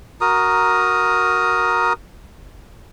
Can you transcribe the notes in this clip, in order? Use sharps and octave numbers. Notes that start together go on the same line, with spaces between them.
F#4 A#4 A#5 D#6